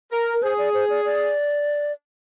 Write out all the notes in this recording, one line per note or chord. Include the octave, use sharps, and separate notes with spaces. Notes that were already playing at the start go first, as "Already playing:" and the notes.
A#4
A#4
G#4 C5
D5
C5
D5
D5